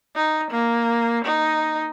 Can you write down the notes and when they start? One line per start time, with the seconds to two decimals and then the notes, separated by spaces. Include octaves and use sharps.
0.16 D#4
0.51 A#3
1.25 D#4